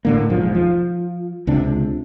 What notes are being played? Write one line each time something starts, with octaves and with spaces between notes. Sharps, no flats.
A2 D3 A#3
E1 B1 G#2 F3
F3
C#2 C3 D4